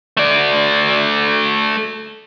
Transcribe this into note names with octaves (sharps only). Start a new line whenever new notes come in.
A3 D5